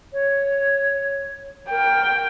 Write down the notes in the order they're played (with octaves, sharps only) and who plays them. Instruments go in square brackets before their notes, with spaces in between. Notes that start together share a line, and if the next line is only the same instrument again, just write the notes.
[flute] C#5
[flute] A#4 [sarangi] G5